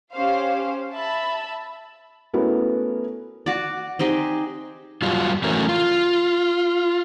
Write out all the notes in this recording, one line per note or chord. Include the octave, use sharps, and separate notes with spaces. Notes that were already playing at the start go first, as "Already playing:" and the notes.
C#4 G4 C5 F5
E5 A5 B5
A3 B3 C#4 E4 F#4 A#4
F#4 D5
C4 D#4 G4 G#4
F#2 F#3 G3 F4
E3 A3 C#4 F#4 A#4
F4